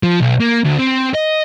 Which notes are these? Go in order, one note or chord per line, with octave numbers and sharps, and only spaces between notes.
F3
B1
A#3
D2
C4
D#5